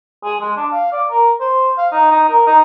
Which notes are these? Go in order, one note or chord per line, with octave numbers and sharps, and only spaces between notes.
G#4
G#3
D4
F5
D5
A#4
C5
F5
D#4
D#4
A#4
D#4